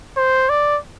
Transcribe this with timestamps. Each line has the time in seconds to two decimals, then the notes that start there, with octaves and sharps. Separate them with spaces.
0.17 C5
0.49 D5